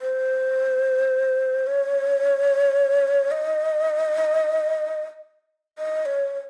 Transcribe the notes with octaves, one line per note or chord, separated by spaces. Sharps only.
C5
C#5
D#5
D#5
C#5
C#5